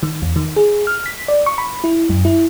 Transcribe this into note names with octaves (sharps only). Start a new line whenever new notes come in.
D#3
E2
D#3
G#4
F6
B6
D5
C#6
B5
E4
F#2
E4